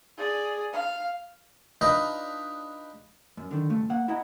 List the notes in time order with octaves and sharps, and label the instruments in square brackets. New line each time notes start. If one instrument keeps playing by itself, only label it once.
[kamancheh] G#4 D5
F5
[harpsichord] D4 D#4 F4 B4 D#5
[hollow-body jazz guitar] F#2
D3 D#3
C#2 G2 A3
A#3 F#5
E4 D#5 F#5 A#5